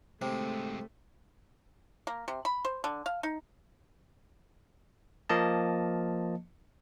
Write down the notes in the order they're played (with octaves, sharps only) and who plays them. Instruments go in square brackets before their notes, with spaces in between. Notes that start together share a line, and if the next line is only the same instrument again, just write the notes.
[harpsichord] C3 [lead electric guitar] G#3 C4 [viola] A3
[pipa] A#3
C3
B5
C5
D3
F5
D#4
[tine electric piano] F3 A#3 D#5 A5